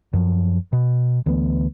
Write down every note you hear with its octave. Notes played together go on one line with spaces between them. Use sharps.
F#2 F3
B2
D2 E3 A3 B3